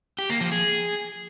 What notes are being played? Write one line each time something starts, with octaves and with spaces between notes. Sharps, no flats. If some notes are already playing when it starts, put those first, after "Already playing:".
G4
A#3
F3
G#4